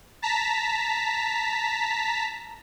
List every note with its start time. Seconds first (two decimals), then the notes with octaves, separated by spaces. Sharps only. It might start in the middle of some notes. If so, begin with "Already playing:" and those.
0.22 A5 A#5 B6